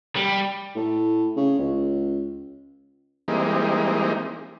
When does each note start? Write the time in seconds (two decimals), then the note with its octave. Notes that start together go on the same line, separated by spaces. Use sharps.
0.16 G3
0.76 A2
1.37 C#3
1.59 C#2
3.28 E3 G3 G#3 A#3 C4 D#4